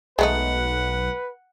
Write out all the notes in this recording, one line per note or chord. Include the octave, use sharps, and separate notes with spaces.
B1 G#3 A3 D#4 B4 F#5